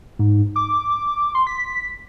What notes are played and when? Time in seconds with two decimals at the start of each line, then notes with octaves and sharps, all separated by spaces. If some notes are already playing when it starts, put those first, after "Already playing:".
0.19 G#2
0.56 D6
1.35 C6
1.47 B6